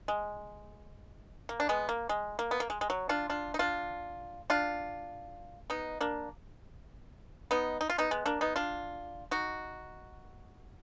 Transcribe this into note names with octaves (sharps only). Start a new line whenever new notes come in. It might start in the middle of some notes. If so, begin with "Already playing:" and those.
G#3
A#3
D4
G#3 B3
A#3
G#3
A#3
B3
A#3
G#3
G#3
F#3
D4 F4
D4 F4
D#4
D4 F4
D4 F4
B3 D#4
A#3 D4
B3 D#4
D#4
F4
B3 D#4
G#3 B3
A#3 D4
B3 D#4
D4 F4
D#4 F#4